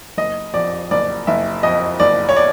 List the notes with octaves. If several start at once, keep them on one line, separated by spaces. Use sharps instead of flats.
F#1 D#5
F2 D5
F#1 D5
F#1 E5
F2 D#5
F#1 D5
C#5
D5